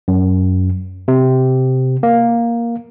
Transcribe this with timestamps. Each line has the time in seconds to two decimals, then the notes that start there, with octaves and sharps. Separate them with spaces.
0.08 F#2
1.08 C3
2.03 A#3